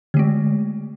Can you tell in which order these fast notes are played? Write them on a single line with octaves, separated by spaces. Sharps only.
D3 A3 G#3